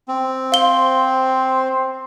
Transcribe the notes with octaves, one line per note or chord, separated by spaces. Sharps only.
C4
C5 F5 G7